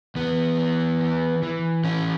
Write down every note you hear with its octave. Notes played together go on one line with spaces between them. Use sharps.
E2 B3
E3
E3
E3
E3 C#4